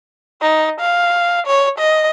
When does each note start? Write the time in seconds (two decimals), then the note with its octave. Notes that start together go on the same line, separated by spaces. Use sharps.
0.41 D#4
0.80 F5
1.47 C#5
1.79 D#5